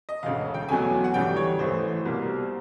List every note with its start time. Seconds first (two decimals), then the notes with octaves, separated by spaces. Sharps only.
0.09 D#5
0.23 E1 D2 C#3 F5
0.54 G5
0.69 E2 B2 F#3 A3 C#4 G#5
1.04 F#5
1.14 D2 C#3 E3 G3 G5
1.36 C#5
1.59 A1 A2 E3 A3 C5
2.05 C2 B2 G3 A#3